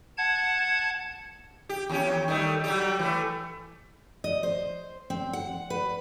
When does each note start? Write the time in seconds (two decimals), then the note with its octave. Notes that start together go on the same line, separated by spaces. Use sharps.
0.18 F#5 A5 G#6
1.69 G4
1.90 D#2 C#4 G4
2.28 D#3 G3 A3
2.64 F#3 G3 G4
2.99 E3 A3
4.24 D#5
4.43 C5
5.10 C4
5.33 F#5
5.70 B4